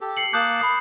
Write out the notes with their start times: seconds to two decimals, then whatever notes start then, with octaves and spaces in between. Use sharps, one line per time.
0.01 G4 A4
0.17 C7 C#7 F#7
0.33 A#3 A5 D6 D#6 F#6 G6
0.59 B5 D#6 C7